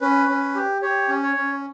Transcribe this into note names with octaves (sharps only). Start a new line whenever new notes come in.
C#4 B4
C#4
G4
G4 C#5
C#4
C#5
C#4